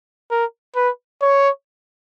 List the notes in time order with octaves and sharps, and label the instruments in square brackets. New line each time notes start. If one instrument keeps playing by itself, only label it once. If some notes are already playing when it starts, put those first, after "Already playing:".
[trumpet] A#4
B4
C#5